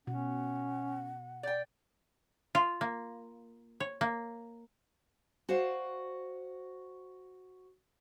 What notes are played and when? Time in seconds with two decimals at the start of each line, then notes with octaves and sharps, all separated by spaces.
0.07 B2 C#4 F#5
1.43 D5 G5
2.55 F4
2.81 A#3
3.80 C#5
4.01 A#3
5.49 F#4 C5 D5 F5 F#5